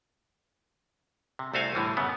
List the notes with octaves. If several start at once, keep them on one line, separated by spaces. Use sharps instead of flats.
C3
C2 A3 F#4 C5 F5 G#5
A2 D3 E3 G3
F#2 C#3 B3